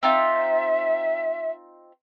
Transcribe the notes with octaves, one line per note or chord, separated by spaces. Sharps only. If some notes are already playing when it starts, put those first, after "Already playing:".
C4 D#4 F4 E5